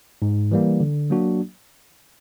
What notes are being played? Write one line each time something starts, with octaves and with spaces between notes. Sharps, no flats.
G#2
E3 G3 A#3
D3
F#3 A#3 D4 F#4